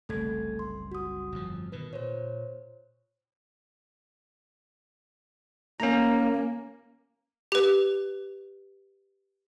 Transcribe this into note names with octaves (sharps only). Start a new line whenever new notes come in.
F#1 C2 A3 A4 G#6
C6
F#4 D#6
G1 F2 F3
B2 D#3 B4
A#2 C5 C#5
A#3 C#4 A#5
G4 B4